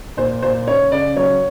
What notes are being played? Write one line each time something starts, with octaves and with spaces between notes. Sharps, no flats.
A#2 C5
A#2 C5
C#3 C#5
C#3 D5
F#3 C#5